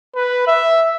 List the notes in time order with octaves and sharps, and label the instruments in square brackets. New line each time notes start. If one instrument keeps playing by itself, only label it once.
[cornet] B4
E5